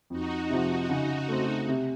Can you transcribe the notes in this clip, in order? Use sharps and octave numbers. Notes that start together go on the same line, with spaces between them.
F2 D#4 F#4
C3 F3
C#3
A3 C4
C3